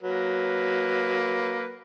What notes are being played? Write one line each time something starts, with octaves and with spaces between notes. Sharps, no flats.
F#3 A#3 B4